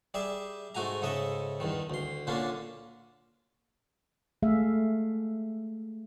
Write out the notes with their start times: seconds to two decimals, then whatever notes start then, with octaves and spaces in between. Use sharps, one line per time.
0.14 G3 G#4 D5 E5
0.75 G#2 A3 F#4 G#5 A#5
1.02 G#2 C#3 A4 D#5 E5
1.60 E2 G2 D#3
1.90 D2 C6
2.27 A#2 D3 A#3 C#4 D4
4.43 G#3 A3 G#4 E5 F5